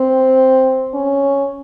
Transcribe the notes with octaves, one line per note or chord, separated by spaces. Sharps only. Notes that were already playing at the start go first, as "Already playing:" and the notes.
Already playing: C4
C#4